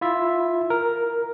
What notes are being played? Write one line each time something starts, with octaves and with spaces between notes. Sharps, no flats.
E4 F4 E5
A#4